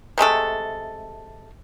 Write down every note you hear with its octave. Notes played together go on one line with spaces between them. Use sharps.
C3 G#3 A3 A4